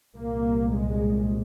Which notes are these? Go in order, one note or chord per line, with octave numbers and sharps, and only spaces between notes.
C2 A#2 A#3
G#3